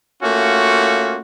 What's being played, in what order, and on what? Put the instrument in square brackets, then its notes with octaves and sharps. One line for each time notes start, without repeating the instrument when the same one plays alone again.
[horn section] A3 A#3 C#4 F4 F#4